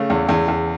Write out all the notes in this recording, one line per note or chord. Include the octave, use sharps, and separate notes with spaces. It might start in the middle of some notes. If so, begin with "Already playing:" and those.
Already playing: C#3 A3
E2
E2
E2